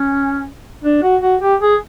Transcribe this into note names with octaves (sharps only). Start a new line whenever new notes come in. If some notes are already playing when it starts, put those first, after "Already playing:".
Already playing: C#4
D4
F#4
F#4
G4
G#4